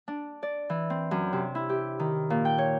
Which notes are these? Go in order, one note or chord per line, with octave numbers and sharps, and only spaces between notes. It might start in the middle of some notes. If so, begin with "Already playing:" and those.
D4
D5
E3
C4
F#2
C3
E4
G4
D#3
A#2
G5
C#5